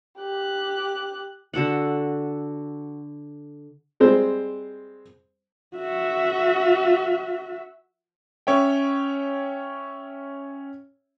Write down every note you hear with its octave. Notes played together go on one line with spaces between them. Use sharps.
G4 F#6
D3 F#4 A4 F#5
G3 G#3 C4 C5
F#4 E5
C#4 C#5 E5 G5